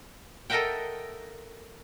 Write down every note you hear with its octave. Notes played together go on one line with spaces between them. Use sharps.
A4 A#4 D#5 E5 F#5 G5